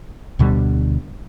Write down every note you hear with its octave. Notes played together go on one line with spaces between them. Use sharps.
D2 B2 D3 G3